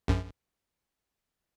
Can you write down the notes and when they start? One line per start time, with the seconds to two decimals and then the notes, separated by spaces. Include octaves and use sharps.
0.08 A#1 F#2